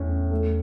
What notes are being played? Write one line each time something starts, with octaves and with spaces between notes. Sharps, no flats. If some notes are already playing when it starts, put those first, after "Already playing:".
Already playing: E2 A2 C#4
A3